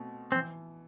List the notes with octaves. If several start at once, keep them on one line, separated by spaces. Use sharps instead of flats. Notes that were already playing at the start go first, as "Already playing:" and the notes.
Already playing: B2 A3 C4
E3 C4